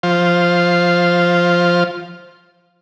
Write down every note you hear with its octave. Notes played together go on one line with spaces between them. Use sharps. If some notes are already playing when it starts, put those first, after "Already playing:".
F3 C5 F5